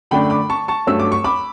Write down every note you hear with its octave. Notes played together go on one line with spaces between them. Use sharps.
F#2 D3 A3 D4 G5 B5
B5 D6
A5 C#6
A5 C#6
G2 F#3 A3 C#4 E6
D6
C#6
B5 D6